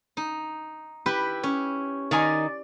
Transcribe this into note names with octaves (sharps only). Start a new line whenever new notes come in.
D#4
E4 G4 B4
C#4
D#3 D#4 D5 G#5